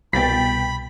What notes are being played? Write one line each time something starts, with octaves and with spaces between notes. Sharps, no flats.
C2 B2 G5 B5 A6 B6